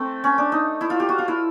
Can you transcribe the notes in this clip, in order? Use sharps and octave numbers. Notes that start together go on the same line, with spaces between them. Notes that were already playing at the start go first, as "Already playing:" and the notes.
Already playing: A3 C4
C#4
D4
D#4
E4
F4
G4
F#4
F4
E4